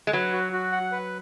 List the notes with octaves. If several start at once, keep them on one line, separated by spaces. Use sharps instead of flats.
G#3
F#3 B4
F#4
F#4
F#5
B4